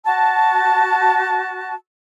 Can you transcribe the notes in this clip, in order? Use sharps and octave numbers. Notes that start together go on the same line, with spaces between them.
F#4 A5